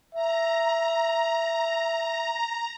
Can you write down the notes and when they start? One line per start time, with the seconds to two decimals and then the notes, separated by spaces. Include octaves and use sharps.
0.15 E5 A#5